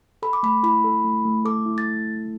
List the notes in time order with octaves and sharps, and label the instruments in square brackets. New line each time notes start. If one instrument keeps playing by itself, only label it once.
[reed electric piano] A4 [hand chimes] B5
[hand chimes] D6
[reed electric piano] A3 [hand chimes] B5
[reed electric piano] E4 [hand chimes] B5
[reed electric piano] A4
A3
A3
[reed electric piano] A4 [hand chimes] D6
[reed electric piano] E4
[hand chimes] A6